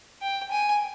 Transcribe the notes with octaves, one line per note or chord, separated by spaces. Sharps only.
G5
G#5